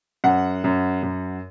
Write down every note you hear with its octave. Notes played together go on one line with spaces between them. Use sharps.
F#2 F#5
F#2
F#2